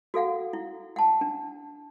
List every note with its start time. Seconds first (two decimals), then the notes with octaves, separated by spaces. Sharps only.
0.14 F#4 A4 F5 F#5
0.53 E4
0.96 F#5 A5
1.21 D4